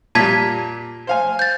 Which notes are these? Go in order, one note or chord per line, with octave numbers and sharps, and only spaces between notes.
A#2 G3 A5 G#6 B6
C5 F5 G#5
G6 A6